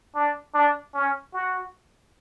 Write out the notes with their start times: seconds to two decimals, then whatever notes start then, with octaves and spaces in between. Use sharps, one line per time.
0.15 D4
0.55 D4
0.94 C#4
1.33 F#4